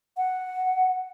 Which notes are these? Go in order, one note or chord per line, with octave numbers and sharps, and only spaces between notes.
F#5